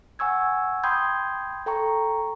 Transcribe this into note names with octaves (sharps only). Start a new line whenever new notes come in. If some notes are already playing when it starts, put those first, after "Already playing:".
F#5 G#5 C#6 E6 G#6
G5 B5 C6 D#6 G6 G#6
A4 G5 A#5 C#6